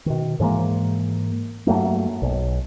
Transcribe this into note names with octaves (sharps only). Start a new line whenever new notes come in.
B2 D#3
G#2 E3 G#3 A#3
G2 F#3 A3 A#3
B1